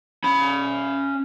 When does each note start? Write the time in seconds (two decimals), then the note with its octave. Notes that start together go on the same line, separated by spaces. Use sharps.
0.24 C#4 B5